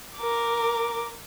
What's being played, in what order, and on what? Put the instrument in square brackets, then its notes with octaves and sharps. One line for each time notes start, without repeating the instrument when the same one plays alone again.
[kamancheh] A#4 D6